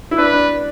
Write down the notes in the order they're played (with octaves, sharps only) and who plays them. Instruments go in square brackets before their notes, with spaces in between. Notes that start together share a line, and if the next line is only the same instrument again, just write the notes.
[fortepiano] E4
[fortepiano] D4 [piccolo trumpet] B4
[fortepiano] D4